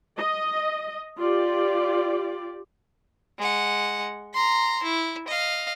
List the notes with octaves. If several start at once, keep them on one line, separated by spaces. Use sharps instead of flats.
D#5
F4 G4 D5
G#3 F#5
A#5 C6
E4
D#5 F5